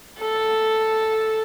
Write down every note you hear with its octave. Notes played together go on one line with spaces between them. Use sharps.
A4